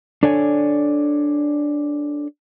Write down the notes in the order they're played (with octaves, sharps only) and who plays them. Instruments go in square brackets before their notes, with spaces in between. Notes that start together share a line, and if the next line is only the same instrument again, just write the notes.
[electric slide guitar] D4 A4 C#5 D5 G#5